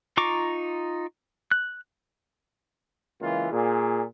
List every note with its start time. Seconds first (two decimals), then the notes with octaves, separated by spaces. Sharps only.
0.17 D#4 F4 A#5 C#6 D6
1.51 F#6
3.21 C#2 E3 A#3 F4
3.52 A#2 G#4